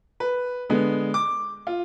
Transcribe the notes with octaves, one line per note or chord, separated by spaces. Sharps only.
B4
D3 G#3 B3
D6
F4